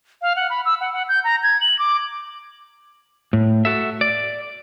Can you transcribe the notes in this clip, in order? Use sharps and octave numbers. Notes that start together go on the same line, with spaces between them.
F5
F#5
B5
E6
F#5
F#5
G6
A#5
G#6
F#7
D6
A2
F#4 A4 E5
D5